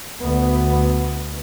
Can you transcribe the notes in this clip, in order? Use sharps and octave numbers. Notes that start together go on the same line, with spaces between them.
D2 B3